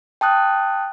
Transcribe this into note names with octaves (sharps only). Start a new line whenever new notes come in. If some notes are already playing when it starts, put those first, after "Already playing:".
G5 A5 D#6 F#6